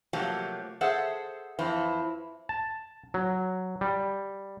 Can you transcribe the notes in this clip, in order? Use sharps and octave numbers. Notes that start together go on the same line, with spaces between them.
C3 F3 F#3 A3 A#3 G4
G#4 A4 C5 E5 F#5
F2 E3 F3 C4 E4
A5
F#3
G3